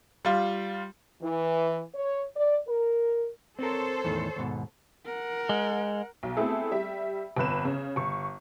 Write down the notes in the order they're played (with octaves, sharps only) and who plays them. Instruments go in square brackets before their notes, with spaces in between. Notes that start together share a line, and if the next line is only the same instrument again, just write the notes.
[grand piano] G3 F4
[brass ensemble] E3
C#5
D5
A#4
[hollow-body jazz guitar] C4 A#4 [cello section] A4 C5 C#5
[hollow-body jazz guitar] E2 A2 D#3
D#2 G#2 B2
[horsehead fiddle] A#4 F#5
[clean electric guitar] G#3
[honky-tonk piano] B1
A3 B3 C4 E4 G#4 A4
G3 E5
G1 F2 B4 E7
C#3
G1 C#6